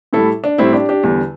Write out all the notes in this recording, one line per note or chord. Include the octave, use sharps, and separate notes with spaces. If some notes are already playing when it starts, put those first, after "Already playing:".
A2 G3 E4 A4
D4
A2 G3 C4 E4
D4 G4
D4 G4
E2 D3 G3